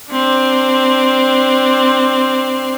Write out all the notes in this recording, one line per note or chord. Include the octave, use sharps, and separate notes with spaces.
C4 D4